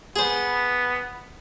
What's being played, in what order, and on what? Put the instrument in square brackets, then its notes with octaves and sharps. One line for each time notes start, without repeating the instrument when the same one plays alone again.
[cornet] B3 [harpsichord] G#4 C5